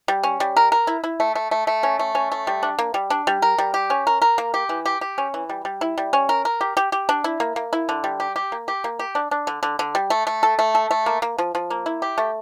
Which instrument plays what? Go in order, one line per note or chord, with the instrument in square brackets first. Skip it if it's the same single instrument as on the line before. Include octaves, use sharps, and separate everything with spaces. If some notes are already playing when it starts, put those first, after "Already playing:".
[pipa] G3
C#4
G3
A#4
A#4
E4
E4
A3
A3
A3
A3
C#4
A3
C#4
A3
G3
D4
A#3
G3
D4
G3
A#4
G3
G4
C#4
A#4
A#4
A#3
G4
E3
G4
G4
C#4
E3
G3
G3
E4
G3
C#4
A#4
A#4
G4
G4
G4
D4
E4
A#3
A#3
E4
D3
G3
G4
G4
A#3
G4
A#3
G4
D4
D4
D3
D3
D3
G3
A3
A3
A4
A3
A4
A3
A#3
A#3
F3
F3
A#3
E4
G4
A3